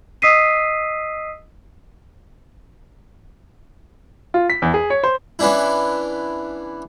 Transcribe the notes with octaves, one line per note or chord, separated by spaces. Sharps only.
D#5 D#6 E6 B6 C7 D#7
F4
B6
E2
G#4
C#5
C5
E3 B3 C#4 D4 E4